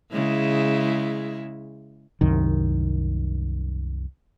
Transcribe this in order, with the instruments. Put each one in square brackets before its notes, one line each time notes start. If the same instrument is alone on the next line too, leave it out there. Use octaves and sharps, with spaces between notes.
[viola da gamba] C#3 G#3 E4
[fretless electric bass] C2 F#2 D#3